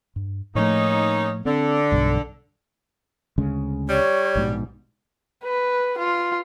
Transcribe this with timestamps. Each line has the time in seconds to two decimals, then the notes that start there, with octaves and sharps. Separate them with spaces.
0.16 G2
0.55 A2 F3 A3 A#3 C#4 D#4
1.45 D3 C4
1.92 B1 G2
3.38 D2 C#3 G#3
3.89 G3 C#5
4.35 A#1 G#2 B2
5.44 B4
5.98 F4